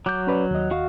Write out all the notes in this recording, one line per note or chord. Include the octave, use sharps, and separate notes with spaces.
F#3 D6 G6
C#4 B4 D5
D#2 D#5
F#4 F5